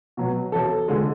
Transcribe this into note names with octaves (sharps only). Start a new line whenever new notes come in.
B2 F#3
E1 A4
D3 G#3